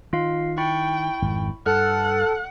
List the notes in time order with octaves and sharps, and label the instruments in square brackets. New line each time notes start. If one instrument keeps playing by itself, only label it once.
[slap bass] D#3 [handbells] F4 F5
[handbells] E4 B5 C#6 [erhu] G5
[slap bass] G#1 F2
[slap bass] G2 [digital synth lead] A4 [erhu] F#5 [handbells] F6 F#6